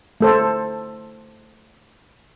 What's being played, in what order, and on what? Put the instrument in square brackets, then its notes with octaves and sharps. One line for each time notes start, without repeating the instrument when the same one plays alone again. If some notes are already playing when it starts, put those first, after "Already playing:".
[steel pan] A3 A4 C5